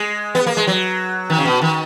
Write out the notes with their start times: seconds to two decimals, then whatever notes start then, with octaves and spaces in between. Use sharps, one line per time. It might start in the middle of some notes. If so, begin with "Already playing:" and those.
Already playing: G#3
0.35 B3
0.47 A#3
0.57 G#3
0.67 F#3
1.30 D#3
1.38 C#3
1.46 B2
1.62 D#3